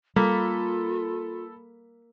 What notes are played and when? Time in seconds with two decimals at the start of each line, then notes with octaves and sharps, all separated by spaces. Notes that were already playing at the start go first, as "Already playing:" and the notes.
0.16 G3 A#3 F4 A4 B5 B6